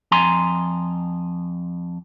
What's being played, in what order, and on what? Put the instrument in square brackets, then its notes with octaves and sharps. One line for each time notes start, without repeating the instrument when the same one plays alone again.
[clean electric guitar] F2 G#5 A#5 C6